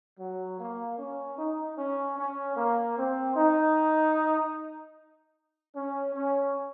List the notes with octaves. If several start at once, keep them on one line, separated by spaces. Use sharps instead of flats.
F#3
A#3
C#4
D#4
C#4
C#4
A#3
C4
D#4
C#4
C#4